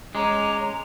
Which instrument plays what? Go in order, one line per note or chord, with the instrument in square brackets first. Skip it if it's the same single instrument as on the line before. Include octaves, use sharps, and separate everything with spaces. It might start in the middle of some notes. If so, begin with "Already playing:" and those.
[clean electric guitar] G#3 [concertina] C#4 C#5 D6 [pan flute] A#5